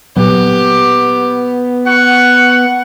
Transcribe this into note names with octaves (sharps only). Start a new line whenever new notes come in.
A#2 F#3 B3 G4
F#5 C#6